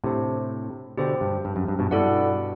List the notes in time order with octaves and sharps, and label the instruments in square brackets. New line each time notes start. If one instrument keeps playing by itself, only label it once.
[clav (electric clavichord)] A2 C3 [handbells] D4 G4 C5
[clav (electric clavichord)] B2 D3 [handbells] G4 C5 G5
[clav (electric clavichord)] G2
G2
F#2
G2
G2 B2
[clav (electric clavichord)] G2 B2 [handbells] B3 E4 A4 D5 F#5